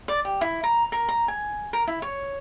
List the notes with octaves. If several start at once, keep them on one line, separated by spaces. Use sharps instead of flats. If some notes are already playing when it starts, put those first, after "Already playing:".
D5
G4
E4
A#5
A#4
A#5
G#5
A#4
E4
C#5